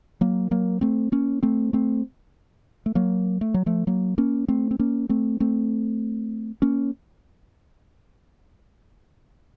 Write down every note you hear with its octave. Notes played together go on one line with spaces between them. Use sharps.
F#3 A#3
F#3 A#3
A3 C4
A#3 C#4
A3 C4
A3 C4
A3
F#3 A#3
A3
F#3
F3 A3
F#3 A#3
A#3 C#4
A3 C4
C4
A#3 C#4
A3 C4
A3 C4
A#3 C#4